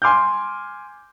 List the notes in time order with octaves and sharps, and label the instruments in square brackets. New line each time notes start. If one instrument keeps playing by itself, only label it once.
[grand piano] G#5 C6 D6 F6 G6